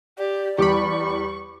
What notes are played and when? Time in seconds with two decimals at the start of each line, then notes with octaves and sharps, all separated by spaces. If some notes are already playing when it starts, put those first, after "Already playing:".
0.18 G4 D5
0.58 E2 G3 G4 B5 C#6 D6